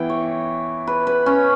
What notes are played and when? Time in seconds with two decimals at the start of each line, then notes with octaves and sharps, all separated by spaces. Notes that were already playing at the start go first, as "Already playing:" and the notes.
Already playing: E3 B3 E4 G5
0.09 C#5
0.87 B4
1.07 B4
1.26 C#4